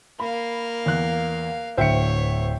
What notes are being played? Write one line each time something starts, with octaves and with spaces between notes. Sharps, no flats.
A#3 F5 B5
E2 F#6
D1 D2 C5 C#5 E5 G5 C#7